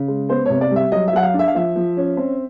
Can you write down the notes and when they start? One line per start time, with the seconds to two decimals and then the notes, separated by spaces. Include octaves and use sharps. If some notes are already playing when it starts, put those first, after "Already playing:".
Already playing: C#3
0.08 G#3
0.29 B3 C5
0.46 C3 C#5
0.61 D5
0.71 G3 E5
0.92 F#3 D#5
1.08 E5
1.13 F#3 F#5
1.23 F5
1.34 D4
1.39 E5
1.48 F5
1.55 F3 E5
1.76 F3
1.97 C#4
2.17 C4